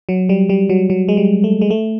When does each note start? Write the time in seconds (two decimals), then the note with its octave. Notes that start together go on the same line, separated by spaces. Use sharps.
0.09 F#3
0.29 G3
0.49 G3
0.70 F#3
0.90 F#3
1.08 G#3
1.17 G3
1.44 A3
1.61 G#3
1.70 A3